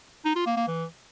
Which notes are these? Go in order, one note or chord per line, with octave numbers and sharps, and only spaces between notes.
D#4
F4
A#3
A#3
E3